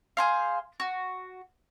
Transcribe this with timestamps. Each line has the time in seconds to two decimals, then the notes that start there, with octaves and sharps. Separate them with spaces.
0.17 G#4 C5 F5
0.80 F#4